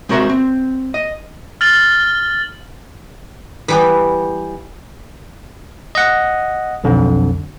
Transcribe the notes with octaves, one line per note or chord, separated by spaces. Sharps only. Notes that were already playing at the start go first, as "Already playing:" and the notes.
G#3 C4 F#4 A#4 C5 E5
C4
D#5
F6 A6 F#7 G7
E3 G3 B3
D#5 F#5
B1 F2 D3